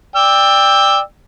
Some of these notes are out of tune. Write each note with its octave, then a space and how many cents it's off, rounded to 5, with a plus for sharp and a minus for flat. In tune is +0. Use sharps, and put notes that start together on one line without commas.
D5 +10 G5 +20 E6 +0